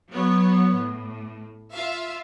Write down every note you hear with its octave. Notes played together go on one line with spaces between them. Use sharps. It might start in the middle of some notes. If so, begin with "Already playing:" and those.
F#3 B3 C#5
A2
F4 E5 F5